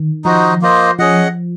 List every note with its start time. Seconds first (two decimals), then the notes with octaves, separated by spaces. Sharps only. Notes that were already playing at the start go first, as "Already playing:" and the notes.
Already playing: D#3
0.24 F3 D#4 F#4 C5 D#5
0.62 A#3 F4 C5 D#5
0.99 F3 C#4 G#4 D#5 F#5